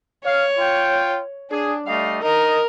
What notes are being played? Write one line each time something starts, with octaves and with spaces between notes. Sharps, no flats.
C#5 F5
F4 G5
D4 G#4
G3 A3 D#5 F5
D#4 A#4 D#5